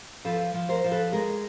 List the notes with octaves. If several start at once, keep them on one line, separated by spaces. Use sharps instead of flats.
F3 A4 B4
F3
A#4 C5
F3
A4 B4
G#3 G#4 A#4